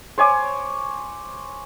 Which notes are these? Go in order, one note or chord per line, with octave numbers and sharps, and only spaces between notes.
C5 C#5 G#5 D6